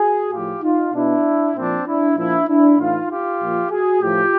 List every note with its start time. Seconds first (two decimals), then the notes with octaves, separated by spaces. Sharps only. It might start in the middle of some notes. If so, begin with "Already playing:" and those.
Already playing: F#4 G#4
0.33 A2 F3 F4 G4
0.63 D#4 F4
0.94 B2 D4 E4
1.56 A#2 F3 C4 D4
1.87 D4 E4
2.17 A#2 F3 D4 E4
2.48 D4 E4
2.79 A2 E3 D#4 F4
3.10 F4 G4
3.41 A#2 F3
3.71 F#4 G#4
4.02 A2 F3 F4 G4